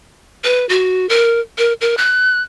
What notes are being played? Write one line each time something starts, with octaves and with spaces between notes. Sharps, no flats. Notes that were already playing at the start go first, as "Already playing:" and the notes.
B4
F#4
A#4
A#4
A#4
F#6